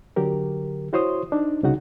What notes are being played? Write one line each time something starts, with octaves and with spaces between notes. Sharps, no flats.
D3 F#3 G4 A#4
E4 F#4 C5 C#5 C6 D#6
D4 D#4
C2 C#3 D#4 F#4 F#5